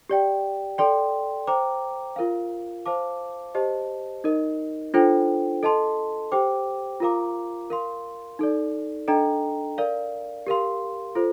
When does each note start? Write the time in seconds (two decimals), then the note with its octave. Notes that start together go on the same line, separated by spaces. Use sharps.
0.09 G4 D5 G5
0.78 A4 D5 G5 C6
1.47 C5 G5 A#5 D6
2.16 F4 A#4 F5
2.86 C5 F5 A5 D6
3.55 G4 C5 D#5 A5
4.24 D#4 A#4 D#5
4.94 D4 F4 A4 C5 G5
5.63 A4 D#5 A5 C6
6.32 G4 C5 G5 D6
7.00 F4 A#4 F5 A#5 D6
7.70 A#4 F5 C6
8.39 D#4 A4 D5
9.08 D4 A4 D#5 G5 A#5
9.78 A#4 D5 F5
10.46 G4 A#4 F5 C6
11.15 F4 A4 C5